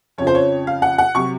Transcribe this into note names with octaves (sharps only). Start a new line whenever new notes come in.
F2 C#3 F3 C#5
C5
C#5
F5
F#5
F#5
C3 F#3 C#6